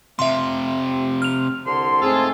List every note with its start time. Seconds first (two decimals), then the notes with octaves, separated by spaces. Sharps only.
0.19 C3 F4 E5 C6
1.22 F6 F7
1.66 C2 D3 C6
2.02 G#2 A3 C4 F4 G#4 A4